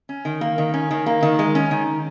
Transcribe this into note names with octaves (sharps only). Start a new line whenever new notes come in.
C#4
D#3
A#3
D#3
C#4
D#3
A#3
D#3
G#3
C#4
D#3